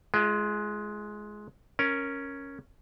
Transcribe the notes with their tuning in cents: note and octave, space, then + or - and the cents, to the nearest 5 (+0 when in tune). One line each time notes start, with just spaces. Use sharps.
G#3 +15 F4 -30
C#4 +0 A#4 +5